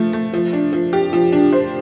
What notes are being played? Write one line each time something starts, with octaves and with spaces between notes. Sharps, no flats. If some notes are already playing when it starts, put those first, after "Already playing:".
Already playing: F3 A3
A3
F3
D4
F3
G4
F3
D4
C5